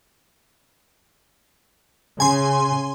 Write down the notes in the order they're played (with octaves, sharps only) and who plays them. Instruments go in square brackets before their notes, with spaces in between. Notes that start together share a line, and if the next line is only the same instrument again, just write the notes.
[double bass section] C#3 [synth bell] G#5 C6